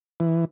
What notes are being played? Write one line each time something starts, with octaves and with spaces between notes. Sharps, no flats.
E3